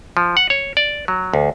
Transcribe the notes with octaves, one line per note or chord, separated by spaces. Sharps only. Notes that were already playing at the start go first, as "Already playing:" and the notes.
F3
F#5
C#5
D5
F#3
D2